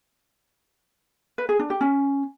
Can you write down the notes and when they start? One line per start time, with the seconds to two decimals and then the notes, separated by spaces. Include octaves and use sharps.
1.38 B4
1.49 G#4
1.59 D4
1.70 G4
1.81 C#4